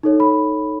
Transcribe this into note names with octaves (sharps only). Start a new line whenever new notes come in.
D#4 A4 C#5
B5